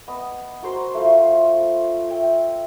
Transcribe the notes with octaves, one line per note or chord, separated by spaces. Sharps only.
B3 D#5 D#6
F#4 A#4 C5 C6
A3 F4 C5
E5 G5